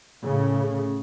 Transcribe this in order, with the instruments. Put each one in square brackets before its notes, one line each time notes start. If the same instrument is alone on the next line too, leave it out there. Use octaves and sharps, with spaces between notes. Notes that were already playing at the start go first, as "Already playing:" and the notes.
[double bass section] A2 C#3